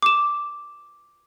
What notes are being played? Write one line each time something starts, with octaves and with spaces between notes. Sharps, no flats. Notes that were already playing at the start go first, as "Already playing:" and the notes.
D6 E7